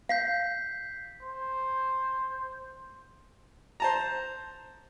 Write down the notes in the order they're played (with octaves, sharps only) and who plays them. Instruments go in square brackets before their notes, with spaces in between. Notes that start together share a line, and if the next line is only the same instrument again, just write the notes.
[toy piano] F5 [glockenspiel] G6 B6 C7
[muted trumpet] C5
[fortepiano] C5 A5 A#5